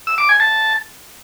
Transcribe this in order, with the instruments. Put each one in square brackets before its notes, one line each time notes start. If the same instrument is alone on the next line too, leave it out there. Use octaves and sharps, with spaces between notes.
[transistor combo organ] E6
D6
G#5
A5